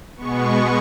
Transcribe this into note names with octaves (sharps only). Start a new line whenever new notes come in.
B2 G#3 B3 C#6